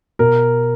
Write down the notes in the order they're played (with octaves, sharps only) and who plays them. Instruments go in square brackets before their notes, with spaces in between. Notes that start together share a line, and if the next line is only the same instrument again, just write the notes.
[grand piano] B2 A#4